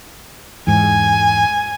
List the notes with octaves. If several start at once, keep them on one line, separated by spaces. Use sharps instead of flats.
E2 G#2 G#5